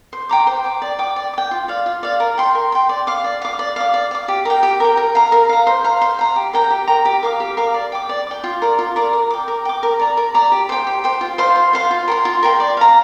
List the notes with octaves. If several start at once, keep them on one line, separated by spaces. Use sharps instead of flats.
C5
G5 A#5 D6
C5
G5 A#5 D6
D5
G5 D6
D5
D6
G5
F4
D5 F5
F4
D5 F5
A#4
G5 C6
A#4
G5 C6
D5
F5 D6
D5
F5 D6
D5
F5 D6
D5
F5 D6
G4
A#4 G5
G4
A#4 G5
A#4
F5 A#5
A#4
F5 A#5
C5
F5 A#5
C5
F5 A#5
G4
A#4 G5 A#5
G4
A#4 G5 A#5
G4
A#4 F5 D6
G4
A#4 F5 D6
D5
G5 D6
D5
G5 D6
F4
A#4 D5
F4
A#4 D5
A#4
G5 D6
A#4
G5 D6
A#4
D5 A#5
A#4
D5 A#5
G4
C5 G5
G4
C5 G5
F4
C5 F5 C6
F4
C5 F5 C6
F4
A#4 G5 C6
F4
A#4 G5 C6
D5
F5 A#5